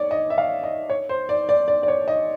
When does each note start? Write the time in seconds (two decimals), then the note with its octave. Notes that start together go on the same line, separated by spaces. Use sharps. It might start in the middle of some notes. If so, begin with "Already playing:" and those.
Already playing: C#5 D5
0.11 D#5
0.30 E5
0.38 F5
0.64 D#5
0.90 C#5
1.09 C5
1.29 D5
1.49 D5
1.68 D5
1.83 D5
1.88 C#5
2.08 D#5